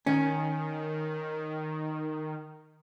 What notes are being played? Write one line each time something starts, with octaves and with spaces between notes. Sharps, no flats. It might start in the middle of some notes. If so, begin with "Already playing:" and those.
D#3 C#4